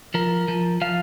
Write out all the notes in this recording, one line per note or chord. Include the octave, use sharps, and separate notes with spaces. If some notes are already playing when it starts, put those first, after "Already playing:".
F3 A#4
F3
F3 F5